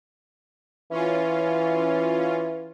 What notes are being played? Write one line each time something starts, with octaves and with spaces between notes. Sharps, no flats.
E3 C#4 F4